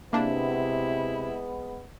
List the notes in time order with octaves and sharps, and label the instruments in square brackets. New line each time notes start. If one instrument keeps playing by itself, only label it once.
[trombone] C3 [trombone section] G#3 B3 [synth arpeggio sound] A#3 D4 [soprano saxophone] E4